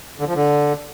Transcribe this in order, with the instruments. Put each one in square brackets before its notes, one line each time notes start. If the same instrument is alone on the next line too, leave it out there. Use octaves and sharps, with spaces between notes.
[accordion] D3
F3
D3